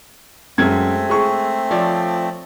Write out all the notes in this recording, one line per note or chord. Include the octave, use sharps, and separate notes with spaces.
F#2 G#3 A3 C4 G#6
G#4 C#6
F3 C#5 D5